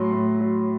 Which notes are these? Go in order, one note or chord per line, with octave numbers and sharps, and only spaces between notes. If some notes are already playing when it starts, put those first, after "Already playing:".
Already playing: A2 F#3 C6
A2
F#3